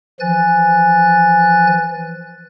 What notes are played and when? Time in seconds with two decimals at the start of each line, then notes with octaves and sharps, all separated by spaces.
0.20 E3 F3 G#5 F#6 A6